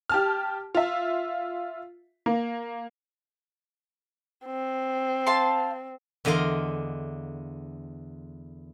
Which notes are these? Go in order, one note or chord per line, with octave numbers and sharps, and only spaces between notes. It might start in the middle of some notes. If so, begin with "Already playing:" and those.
G4 A5 F6
F4 E5
A#3
C4
F5 A5 C6
E2 D3 D#5 F5 A#5 C6